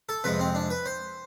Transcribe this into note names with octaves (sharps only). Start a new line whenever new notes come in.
A4
F2 C3 G#3 B4
C4
D4
B4
C5